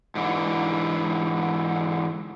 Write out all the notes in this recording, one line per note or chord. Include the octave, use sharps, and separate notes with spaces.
G#2 D3 E3